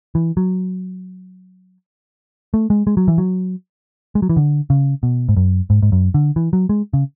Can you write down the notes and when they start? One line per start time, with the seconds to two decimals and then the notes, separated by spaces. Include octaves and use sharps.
0.15 E3
0.37 F#3
2.54 A3
2.70 G#3
2.87 G#3
2.97 F#3
3.08 E3
3.18 F#3
4.15 G#3
4.22 F#3
4.29 E3
4.37 D3
4.70 C#3
5.03 B2
5.29 G#2
5.37 F#2
5.70 G#2
5.83 G#2
5.92 F#2
6.14 D3
6.36 E3
6.53 F#3
6.69 G#3
6.93 C#3